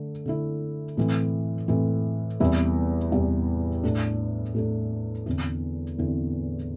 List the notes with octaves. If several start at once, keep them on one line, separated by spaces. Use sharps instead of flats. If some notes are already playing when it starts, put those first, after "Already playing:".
Already playing: D3 A3
D3 A3 E4
A2 E3 C4
A2 E3 C4
E2 C3 G3 E4
E2 C3 G3 E4
A2 A3 D4
A2 A3 D4
E2 D3 C4 E4
E2 D3 C4 E4